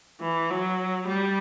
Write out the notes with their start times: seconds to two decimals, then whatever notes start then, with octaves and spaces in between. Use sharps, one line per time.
0.21 E3
0.50 F#3
1.08 G3